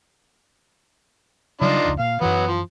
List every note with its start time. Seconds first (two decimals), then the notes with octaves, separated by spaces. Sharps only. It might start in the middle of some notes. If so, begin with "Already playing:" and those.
1.61 C#3 F#3 G3 D4 D#4 F4
1.85 F1 C#2
1.99 A#2 F5
2.21 F#2 E3 F#3 B3
2.48 F3